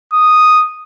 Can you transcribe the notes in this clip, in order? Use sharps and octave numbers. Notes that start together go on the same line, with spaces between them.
D#6